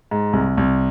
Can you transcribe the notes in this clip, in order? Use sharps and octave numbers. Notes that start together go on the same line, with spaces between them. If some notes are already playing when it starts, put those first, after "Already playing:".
G#2
C2
C2